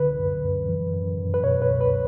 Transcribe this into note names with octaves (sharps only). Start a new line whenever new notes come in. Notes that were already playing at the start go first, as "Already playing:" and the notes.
Already playing: C#2 D3 B4
F#2
F#2
E3
F#2
F#2
B4
B2 C#5
B4
C#2
B4